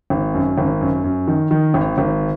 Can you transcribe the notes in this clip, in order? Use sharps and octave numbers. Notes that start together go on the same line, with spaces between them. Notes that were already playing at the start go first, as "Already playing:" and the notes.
G#1
F#2
G#1
F#2
F#2
D#3
D#3
G#1
G#1